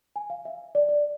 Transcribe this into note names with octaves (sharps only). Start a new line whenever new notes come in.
G#5
F5
E5
D5
D5